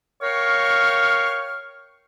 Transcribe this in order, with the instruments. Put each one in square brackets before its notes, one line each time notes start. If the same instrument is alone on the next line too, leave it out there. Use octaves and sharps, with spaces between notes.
[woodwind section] A#4 C#5 F5 G5 C#6 F6